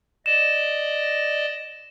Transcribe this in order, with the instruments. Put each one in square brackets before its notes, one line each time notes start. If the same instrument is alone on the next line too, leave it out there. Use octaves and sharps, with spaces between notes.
[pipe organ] D5 D#5 [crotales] E7